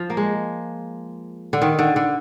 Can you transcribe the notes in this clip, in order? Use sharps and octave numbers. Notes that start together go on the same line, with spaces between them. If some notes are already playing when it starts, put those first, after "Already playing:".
Already playing: F3
A#3
G#3
D3
D#3
D3
D3